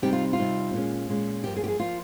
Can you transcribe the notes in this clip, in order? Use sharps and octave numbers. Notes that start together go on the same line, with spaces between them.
C3 G3 C4 D#4 G4
F4
F4
C3 G3 C4 D#4
A#2 G#3 C#4
A#2 G#3 C#4
G2 F3 A#3 G4
G#4
G4
G#4
F3 A#3 F4